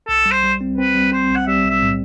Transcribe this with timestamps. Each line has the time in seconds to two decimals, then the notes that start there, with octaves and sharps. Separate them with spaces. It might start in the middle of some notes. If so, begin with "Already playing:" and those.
0.08 B1 A4
0.26 G3
0.32 C5
0.43 G3
0.61 C4
0.78 C4 B4
0.95 G3
1.12 C4 C5
1.30 B1
1.36 F#5
1.47 G3 E5
1.64 B1
1.70 E5
1.82 A2